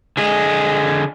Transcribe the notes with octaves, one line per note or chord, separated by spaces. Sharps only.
D3 G#4 D#5